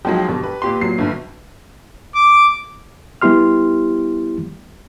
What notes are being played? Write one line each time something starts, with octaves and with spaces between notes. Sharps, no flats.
F3 F#3 G#3 D#4 G4
G2 B2
B4
A#2 G4 C6
A#2 F#3 C7
G1 G2
D6
G3 B3 E4 G4 C6 F6